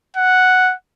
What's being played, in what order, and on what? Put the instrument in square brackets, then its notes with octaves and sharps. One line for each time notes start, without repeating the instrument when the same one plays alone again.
[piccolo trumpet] F#5